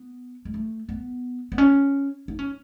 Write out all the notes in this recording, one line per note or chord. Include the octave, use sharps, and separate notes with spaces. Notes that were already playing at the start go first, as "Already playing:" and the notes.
Already playing: B3
G#3
A3
B3
B3
C#4
D#4
C#4